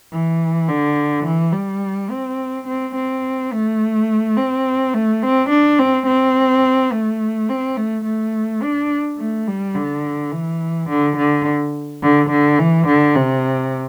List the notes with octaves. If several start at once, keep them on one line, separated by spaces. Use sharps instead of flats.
E3
D3
E3
G3
C4
C4
C4
A3
C4
A3
C4
D4
C4
C4
A3
C4
A3
A3
D4
A3
G3
D3
E3
D3
D3
D3
D3
E3
D3
C3